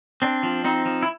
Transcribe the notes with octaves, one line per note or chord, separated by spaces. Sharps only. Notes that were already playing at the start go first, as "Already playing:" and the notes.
C4 D4
F3
C4 D#4
F3
E4